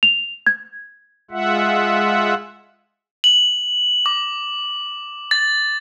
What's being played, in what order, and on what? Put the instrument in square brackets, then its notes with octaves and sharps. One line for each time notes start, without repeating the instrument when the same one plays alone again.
[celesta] F7
G#6
[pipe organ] G#3 F4 E5 F#5
[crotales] F#7
D6
A6